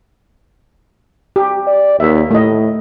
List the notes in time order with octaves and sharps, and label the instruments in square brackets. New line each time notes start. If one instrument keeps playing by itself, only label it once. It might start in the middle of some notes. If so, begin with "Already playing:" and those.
[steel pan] G4
[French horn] D5
[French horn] D#2 [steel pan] E5
[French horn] A2 [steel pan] A3 D#5